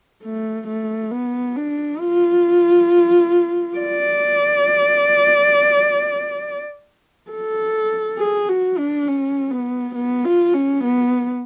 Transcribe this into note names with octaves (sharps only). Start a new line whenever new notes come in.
A3
A3
B3
D4
F4
D5
A4
G#4
F#4
D4
C#4
B3
B3
F4
C#4
B3